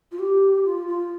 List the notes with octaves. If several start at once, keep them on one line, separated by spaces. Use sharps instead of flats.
F4
G4
F4
F4